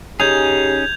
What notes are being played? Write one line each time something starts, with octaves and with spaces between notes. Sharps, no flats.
C#3 C#4 D#4 G4 G#4 G6 G#6 F7